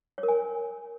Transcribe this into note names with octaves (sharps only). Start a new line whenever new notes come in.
C#5
A#4
G#5